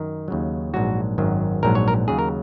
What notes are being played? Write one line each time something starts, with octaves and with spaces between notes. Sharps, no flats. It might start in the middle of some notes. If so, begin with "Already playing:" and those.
Already playing: F#2 D#3
D#2 C#3 F#3
A#1 G#2 F#3 F#4
G#1 F#2 D#3 F#3
A#1 G#2 F#3 A#4
C#5
A#4
D#2 C#3 F#3 G#4
A#4